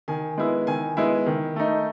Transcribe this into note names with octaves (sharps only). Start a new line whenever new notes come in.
D#3 G#5
G#3 B3 E4
D#3 G#5
G#3 B3 E4
D#3
A3 D#4